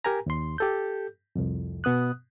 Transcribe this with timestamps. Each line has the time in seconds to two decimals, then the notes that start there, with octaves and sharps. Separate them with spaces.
0.05 G4 A#4 G#5 A#5
0.26 D#2 C6
0.58 G4 A4 G6
1.35 C2 F2
1.84 B2 B3 D#6 F#6